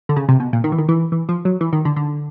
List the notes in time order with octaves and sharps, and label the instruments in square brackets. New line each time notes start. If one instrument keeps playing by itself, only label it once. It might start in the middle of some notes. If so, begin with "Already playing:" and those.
[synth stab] D3
C#3
C3
B2
A#2
D#3
E3
D#3
E3
E3
F3
F#3
E3
D#3
D3
D3